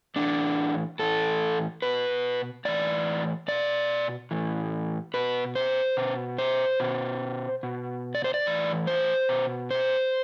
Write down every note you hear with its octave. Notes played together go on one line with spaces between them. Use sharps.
A2 E3 D4
A2 E3 A4
B2 B4
A2 E3 D5
B2 D5
A2 E3
B2 B4
C5
B2
C5
B2
B2
D5
C5
D5
A2 E3
C5
B2
C5